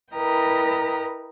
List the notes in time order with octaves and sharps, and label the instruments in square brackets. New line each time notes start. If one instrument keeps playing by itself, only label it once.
[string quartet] E4 A#4 B4 D#5 G5 A#5